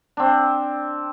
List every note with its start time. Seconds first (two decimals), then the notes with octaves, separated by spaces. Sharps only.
0.17 C4 D4